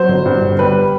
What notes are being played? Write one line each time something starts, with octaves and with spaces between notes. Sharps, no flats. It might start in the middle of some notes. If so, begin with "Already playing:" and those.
Already playing: F#3 C5
G1
G2
G1
G3 B4